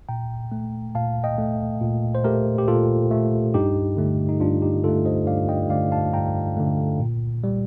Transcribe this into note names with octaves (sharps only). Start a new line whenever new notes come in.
A#2 G5 A#5
A3
A#2 F5 A5
D#5 G5
A3
A#2
C5
A3 G4 A#4
G4
A#2 F4 A4
A3
G2 D#4 G4
D3 A3
D#4
G2 D4 F4
D#4 G4
D3 A3 F4 A4
C5 D#5
G2 D5 F5
D#5 G5
D3 A3 D5 F5
F5 A5
G2 G5 A#5
D3 A3
A#2
G3